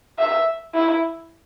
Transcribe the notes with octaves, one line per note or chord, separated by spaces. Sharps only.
E5
E4